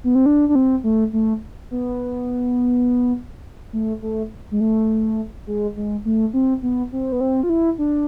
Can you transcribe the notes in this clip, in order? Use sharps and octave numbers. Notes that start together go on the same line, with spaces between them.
B3
C4
D4
D4
C4
A3
A3
B3
A3
A3
G#3
A3
G#3
G#3
A3
C4
B3
C4
B3
C4
F4
E4
D4